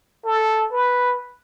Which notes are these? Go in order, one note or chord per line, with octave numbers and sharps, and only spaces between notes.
A4
B4